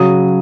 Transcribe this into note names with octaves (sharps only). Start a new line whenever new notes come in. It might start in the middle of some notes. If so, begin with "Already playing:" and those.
Already playing: C#3 F#3 D#6